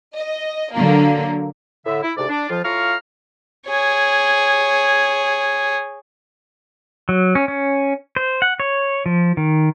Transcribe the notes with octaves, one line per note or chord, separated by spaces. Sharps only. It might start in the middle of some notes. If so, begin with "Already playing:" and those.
D#5
D3 F#3 A#3
A2 D3 E5
E4
D2 G#2 C3 D5
D4
F2 F3 F4
A2 F4 F5 A#5 C#6 F6
G#4 C#5
F#3
C#4
C#4
C5
F#5
C#5
F3
D#3